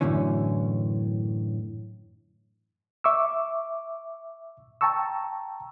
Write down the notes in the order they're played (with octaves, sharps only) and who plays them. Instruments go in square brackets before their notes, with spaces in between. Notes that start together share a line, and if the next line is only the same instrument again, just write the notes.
[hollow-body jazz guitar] F#2 A2 D3 E3 C#4
[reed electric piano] E5 C#6 D6 E6
G5 A5 A#5 C#6 E6